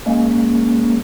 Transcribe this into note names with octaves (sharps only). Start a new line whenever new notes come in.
G#3 A#3 C#4